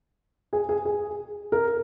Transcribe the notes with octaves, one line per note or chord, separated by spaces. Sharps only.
G#4
G#4
G#4
A#4